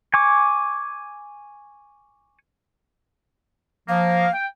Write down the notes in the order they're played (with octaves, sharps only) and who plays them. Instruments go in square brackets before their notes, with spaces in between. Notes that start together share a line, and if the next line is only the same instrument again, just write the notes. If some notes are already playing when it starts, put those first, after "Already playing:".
[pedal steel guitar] G#5 C#6 D6
[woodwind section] F3 A#3 [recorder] F5
[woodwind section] G5